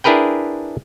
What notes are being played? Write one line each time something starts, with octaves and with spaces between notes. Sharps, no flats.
D4 E4 G#4 A#4 B4 G5